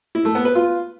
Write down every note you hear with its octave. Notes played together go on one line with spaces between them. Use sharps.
E4
A3
B3
B4
F4